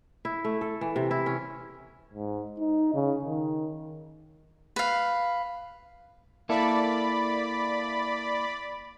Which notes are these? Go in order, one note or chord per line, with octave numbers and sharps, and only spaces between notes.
E4
A3
A4
E3
C3
E4
C#4
G#2
D#4
C#3
D#3
B4 F5
A#3 E4 A4 D5 B5